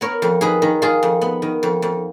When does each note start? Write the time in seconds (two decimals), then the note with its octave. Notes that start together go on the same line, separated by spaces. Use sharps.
0.01 B3 A#4 C#5
0.22 F2
0.41 D#3 G#4 B4
0.62 D#3
0.82 D#3 F4 G#4
1.03 F2
1.21 B3
1.42 D#3
1.63 F2
1.82 F2